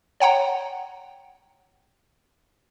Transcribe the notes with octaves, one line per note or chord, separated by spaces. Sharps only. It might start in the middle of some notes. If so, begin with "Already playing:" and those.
C#5 F#5 G5 A#5